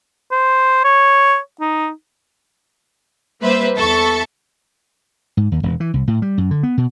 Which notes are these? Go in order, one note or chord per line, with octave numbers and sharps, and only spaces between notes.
C5
C#5
D#4
G3 A#3 C4 B4 C5 E5
E2 A4 E5 A5 C#6 A6
G#2
D#2
E1
E3
C2
A2
G3
F#2
D3
B3
B2